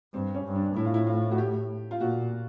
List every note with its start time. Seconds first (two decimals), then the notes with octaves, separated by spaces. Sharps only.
0.14 G2 C4
0.35 C#4
0.45 G2
0.56 D4
0.76 A2 E4
0.85 F4
0.94 E4
1.07 F4
1.31 F#4
1.38 G4
1.91 F4
2.01 A#2 F#4